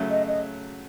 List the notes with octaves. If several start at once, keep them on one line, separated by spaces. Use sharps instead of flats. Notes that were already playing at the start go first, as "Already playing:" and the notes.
Already playing: C#3 F#3 A3
D#5
D#5